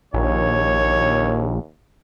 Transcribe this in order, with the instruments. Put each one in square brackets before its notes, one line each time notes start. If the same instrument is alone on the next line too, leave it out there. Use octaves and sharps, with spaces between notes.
[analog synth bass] A#1 [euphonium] D#2 [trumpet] C#5